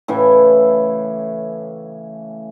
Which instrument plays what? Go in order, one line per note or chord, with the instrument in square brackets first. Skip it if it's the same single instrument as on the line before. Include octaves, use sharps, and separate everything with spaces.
[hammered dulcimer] A2 C#3 E3